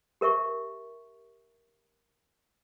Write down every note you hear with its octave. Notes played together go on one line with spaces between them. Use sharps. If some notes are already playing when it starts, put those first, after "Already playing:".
G4 A#4 E5 C#6